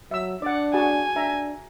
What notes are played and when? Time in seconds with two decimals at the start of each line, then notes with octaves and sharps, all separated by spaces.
0.11 F#3 E5 E6
0.42 D4 D5 F#5
0.74 F#4 G#4 G#5 A5
1.16 D4 E5 A#5